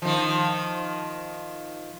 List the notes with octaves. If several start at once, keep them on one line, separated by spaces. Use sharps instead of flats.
D#3 F3